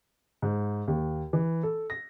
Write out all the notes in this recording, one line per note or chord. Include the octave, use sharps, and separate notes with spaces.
G#2
D#2
E3
A4
A#6